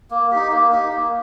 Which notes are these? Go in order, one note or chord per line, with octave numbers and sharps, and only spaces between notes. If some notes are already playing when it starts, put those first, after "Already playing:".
A#3
D#4 G4
A#3
D#4 G4
A#3